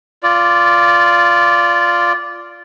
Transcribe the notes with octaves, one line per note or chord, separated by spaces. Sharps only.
F4 D5